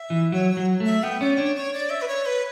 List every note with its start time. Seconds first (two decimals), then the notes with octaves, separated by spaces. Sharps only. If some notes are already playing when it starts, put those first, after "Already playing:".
Already playing: E5
0.10 E3
0.32 F#3 C#5
0.51 C#5
0.57 F#3
0.80 A3
0.86 E5
1.03 B3 G5
1.20 C#4 D5
1.38 D4 C#5
1.56 C#5
1.74 D5
1.90 E5
2.01 B4
2.08 C#5
2.26 B4